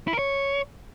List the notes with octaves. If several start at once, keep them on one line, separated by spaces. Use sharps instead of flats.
E4
A#4
C#5